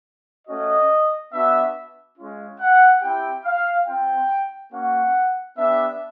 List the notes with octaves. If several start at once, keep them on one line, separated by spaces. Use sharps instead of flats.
A3 C#4 F#4 D#5
B3 D4 F#4 E5
G#3 C#4 F4
F#5
C4 E4 G4 G5
F5
C4 F4 G5
A#3 C#4 F#4 F#5
B3 D4 G4 E5